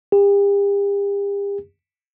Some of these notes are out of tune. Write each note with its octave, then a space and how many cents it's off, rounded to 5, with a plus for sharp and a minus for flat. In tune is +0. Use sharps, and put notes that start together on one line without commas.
G4 +40